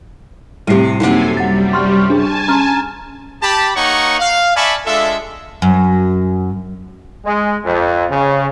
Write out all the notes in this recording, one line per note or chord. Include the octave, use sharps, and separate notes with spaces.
A2 C3 G3 G4 E5 C7 D#7
F#2 A2 C3 A#3 D#4 A4 G#5
G3 F#5 A6
C6 C#6 F6
D4 G#4 G#5 A5
C#4 A#5 C6 F6
G4 A5 B5
A#3 D#4 C#5 F#5 A#5 C#6
F5
D5 E5 G#5 A5 B5 C#6
G#3 D4 F4 A4 E5
F#2
G#3
F2
C#3